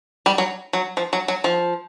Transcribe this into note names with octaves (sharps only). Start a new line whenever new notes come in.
G3
F#3
F#3
F3
F#3
F#3
F3